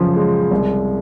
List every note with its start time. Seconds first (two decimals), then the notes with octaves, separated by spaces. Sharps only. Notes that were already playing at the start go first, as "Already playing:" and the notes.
Already playing: F#2 C#3 F3
0.16 G#3
0.51 C2